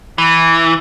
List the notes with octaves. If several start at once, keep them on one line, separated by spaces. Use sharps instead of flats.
E3